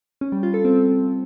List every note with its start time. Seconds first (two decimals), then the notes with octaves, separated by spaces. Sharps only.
0.21 C#4
0.32 G3
0.43 F4
0.54 A4
0.65 C4